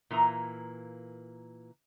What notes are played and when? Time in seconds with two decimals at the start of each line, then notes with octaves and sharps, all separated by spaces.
0.11 A#2 E3 A#3 A#5